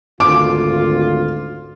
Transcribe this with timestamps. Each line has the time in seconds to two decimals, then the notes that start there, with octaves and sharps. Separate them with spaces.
0.20 G#1 D2 F4 D6